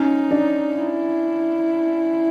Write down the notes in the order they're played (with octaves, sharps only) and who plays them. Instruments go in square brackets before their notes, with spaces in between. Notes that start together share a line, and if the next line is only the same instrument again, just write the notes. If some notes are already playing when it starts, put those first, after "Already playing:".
Already playing: [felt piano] C#4 [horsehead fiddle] D#4
[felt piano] D4
[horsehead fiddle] E4